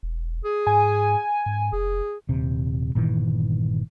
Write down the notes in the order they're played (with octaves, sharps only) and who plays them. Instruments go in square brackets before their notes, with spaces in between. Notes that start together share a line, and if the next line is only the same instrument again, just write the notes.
[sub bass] E1
[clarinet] G#4
[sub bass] G#2 [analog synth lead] G#5
[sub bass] G#2
[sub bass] F1 [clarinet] G#4
[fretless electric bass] D#1 C3
G1 A#2 D#3 E3